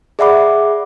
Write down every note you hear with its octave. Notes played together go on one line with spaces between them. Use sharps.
G#4 D5 E5 F#5 B5 D6